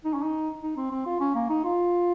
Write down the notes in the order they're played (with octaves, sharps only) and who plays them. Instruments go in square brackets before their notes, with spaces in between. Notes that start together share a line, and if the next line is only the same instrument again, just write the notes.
[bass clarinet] D#4
C#4
D#4
D#4
C4
C4
F4
C#4
A#3
D#4
F4